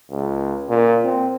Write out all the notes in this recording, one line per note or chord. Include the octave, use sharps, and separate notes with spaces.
C#2
A#2
C4